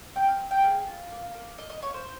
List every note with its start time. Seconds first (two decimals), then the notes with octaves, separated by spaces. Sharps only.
0.15 C4 G5
0.27 F5
0.39 C4
0.51 G5
0.63 G#4 F5
0.86 F4
1.11 A#3
1.34 A#3
1.58 A#3 D#5
1.70 D#5
1.82 A#3 C#5
1.94 C5